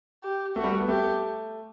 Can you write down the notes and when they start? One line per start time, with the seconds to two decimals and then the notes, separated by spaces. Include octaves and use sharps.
0.23 G4
0.56 A3 F#4
0.64 G3
0.72 A3
0.80 B3
0.88 A3 G4